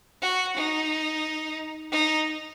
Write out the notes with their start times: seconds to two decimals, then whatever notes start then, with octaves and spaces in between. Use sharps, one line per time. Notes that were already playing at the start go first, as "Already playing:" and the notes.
0.22 F#4
0.57 D#4
1.92 D#4